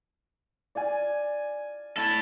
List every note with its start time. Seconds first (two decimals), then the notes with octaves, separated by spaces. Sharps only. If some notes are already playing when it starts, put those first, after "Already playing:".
0.75 D5 F5 G#5
1.97 E4 A4